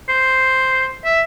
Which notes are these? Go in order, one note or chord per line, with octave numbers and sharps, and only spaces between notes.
C5
E5